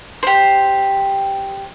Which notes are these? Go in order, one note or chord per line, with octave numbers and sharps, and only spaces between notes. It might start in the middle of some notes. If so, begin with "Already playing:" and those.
G4 C5